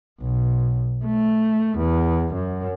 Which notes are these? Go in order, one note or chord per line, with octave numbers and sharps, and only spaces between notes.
B1
A3
E2
F#2